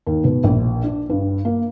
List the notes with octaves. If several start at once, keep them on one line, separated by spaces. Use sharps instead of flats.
D#2
B2
A#1
D4
G2
A#3